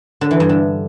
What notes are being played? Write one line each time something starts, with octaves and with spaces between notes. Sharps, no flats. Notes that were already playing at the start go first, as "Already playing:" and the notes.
D3
E3
G2
D3